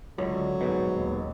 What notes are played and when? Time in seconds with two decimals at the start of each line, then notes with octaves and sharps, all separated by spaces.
0.18 C#2 D3 F#3
0.61 D#1 G#2 B2
0.96 D#2